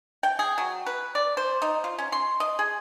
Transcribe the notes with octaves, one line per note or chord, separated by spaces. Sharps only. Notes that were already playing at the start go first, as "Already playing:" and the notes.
G5
G#4
F#3
B4
D5
C5
D#4
F4
C#4
C6
D#5
G#4